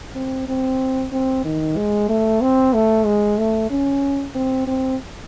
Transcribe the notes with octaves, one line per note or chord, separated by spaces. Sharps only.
C4
C4
C4
D#3
G#3
A3
C4
A3
G#3
A3
C#4
C4
C4